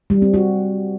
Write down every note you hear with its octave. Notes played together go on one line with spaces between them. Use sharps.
G3
C4
F#4